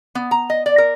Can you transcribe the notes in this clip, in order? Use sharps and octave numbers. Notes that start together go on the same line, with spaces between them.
B3
A#5
D#5
D5
A#4